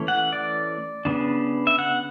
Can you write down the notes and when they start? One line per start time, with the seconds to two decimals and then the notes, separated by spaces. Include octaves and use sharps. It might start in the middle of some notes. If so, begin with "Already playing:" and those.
Already playing: E3 A3 C#4
0.08 F#5
0.33 D5
1.05 C#3 G3 B3 D4
1.67 E5
1.79 F#5